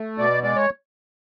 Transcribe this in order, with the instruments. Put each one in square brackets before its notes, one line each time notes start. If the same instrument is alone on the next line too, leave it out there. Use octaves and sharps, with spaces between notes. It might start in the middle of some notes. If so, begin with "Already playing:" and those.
Already playing: [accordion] A3
B2 D5
G#3 D5
C#5